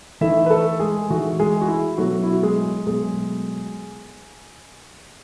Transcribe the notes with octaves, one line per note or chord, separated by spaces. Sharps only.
E3 A3 D#4 E4 E5
B4
A3 A4
G#3 G#4
E3 A3 D#4 F#4
G#3 G#4
F#4
E4
B2 F#3 A3 F#4
E4
F#4
G#3 G#4
B2 F#3 G#3 A3 G#4